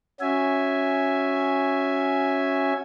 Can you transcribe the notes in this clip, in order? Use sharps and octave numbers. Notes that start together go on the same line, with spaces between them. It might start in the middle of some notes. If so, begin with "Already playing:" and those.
C#4 F#4 E5 G#5